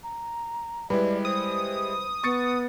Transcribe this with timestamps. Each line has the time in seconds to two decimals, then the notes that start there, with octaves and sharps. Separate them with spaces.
0.03 A#5
0.90 G3 G#3 E4 B4 D5
1.25 C5 D#6
2.23 B3 C#6 A6 C#7